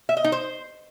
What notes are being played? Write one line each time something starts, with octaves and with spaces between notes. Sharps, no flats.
E5
D#5
D#4
C5